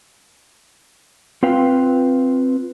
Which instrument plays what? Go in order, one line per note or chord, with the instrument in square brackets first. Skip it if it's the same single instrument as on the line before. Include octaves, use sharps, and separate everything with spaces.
[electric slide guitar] C4 F4 B4 F5 G5